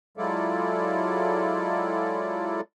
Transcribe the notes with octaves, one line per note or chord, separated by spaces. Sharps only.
F#3 G#3 E4 F4 A4 D5